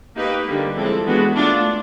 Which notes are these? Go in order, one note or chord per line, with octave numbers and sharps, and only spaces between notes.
A#3 D#4 G4 B4
D3 G3 A#3
F3 G#3 C4 E4 A4
E3 G#3 B3 D4 F#4
A3 D4 F4